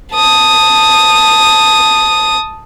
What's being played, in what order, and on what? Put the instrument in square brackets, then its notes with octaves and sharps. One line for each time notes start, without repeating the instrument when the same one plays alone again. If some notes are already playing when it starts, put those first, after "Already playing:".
[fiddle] A5 D#6